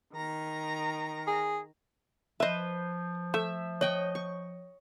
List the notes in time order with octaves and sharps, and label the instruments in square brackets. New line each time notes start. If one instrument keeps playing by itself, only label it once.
[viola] D#3 A#5
[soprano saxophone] G#4
[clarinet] F3 [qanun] B4 C5 [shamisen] D#5 E5
[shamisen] A3 [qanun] E5
[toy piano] C#5 [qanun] D#5 G5 C#6
[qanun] C#6